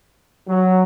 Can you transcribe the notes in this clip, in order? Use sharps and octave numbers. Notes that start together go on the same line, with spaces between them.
F#3